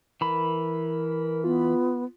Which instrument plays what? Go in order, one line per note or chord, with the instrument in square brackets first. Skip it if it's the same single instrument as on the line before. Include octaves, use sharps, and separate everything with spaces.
[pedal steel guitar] E3 B5 [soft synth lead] A#4
[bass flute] B3 [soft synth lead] F4